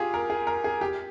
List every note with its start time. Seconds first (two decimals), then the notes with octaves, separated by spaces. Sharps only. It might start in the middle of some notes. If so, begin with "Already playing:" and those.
Already playing: F4 G4 G#4
0.14 A#4
0.30 G#4
0.47 A#4
0.64 G#4
0.81 G4